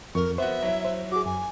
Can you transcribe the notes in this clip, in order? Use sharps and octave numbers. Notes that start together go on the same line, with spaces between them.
F2 A#4 C#6
B3 F#4 C5 E5
F#3 E4
C5
F#4 G#4 D6
F#2 G#5